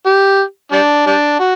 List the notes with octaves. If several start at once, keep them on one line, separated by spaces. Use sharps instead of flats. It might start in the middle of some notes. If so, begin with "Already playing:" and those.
G4
G3 D4
G3 D4
F#4